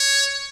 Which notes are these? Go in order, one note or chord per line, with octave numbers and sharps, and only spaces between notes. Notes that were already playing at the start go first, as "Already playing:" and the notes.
Already playing: C#5